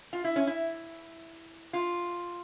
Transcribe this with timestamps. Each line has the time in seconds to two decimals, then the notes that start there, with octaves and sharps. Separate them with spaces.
0.13 F4
0.24 E4
0.36 C#4
0.47 E4
1.73 F4